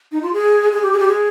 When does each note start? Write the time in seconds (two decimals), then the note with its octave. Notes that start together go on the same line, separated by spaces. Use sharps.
0.12 D#4
0.23 F4
0.33 G#4
0.72 G#4
0.83 G4
0.93 G#4
0.99 G4
1.08 G#4